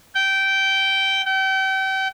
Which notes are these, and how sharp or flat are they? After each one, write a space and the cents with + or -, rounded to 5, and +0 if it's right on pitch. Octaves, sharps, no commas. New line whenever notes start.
G5 -15
G5 -35